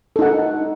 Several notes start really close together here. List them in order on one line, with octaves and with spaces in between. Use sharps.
A4 D#4 F#5